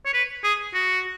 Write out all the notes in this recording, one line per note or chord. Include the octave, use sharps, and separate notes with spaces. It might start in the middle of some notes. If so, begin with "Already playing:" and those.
C#5
B4
G#4
F#4